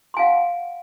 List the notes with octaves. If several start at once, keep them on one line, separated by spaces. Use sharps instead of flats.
F5 F#5 G#5 C6